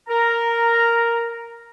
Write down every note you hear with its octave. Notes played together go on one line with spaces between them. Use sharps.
A#4 A#5